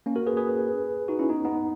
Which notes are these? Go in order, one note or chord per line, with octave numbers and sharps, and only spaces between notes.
A#3 C#4
F#4 A#4
G#4 B4
G#4 B4
D#4 F#4
C#4 E4
B3 D#4
B3 D#4